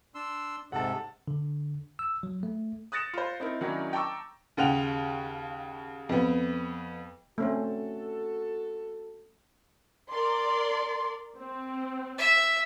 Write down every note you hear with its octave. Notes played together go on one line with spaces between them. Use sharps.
D4 C6 E6
G#2 C3 A4 F#5 A5
D3
E6
F#3
A3
D#6 F#6 A6 A#6 C#7 E7
F4 C5
C4 D#4 E4 A#4
D#3 F#3 A#3 C#4 D4 E4
G5 A5 A#5 C#6 D6 E6
D#2 C#3 F#5 G5 F7
F2 B3
A3 C4 C#4 F#4 A4
A#4 D5 C6
C4
E5